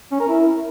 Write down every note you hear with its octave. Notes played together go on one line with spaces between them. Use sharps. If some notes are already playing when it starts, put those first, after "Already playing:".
C#4
A#4
E4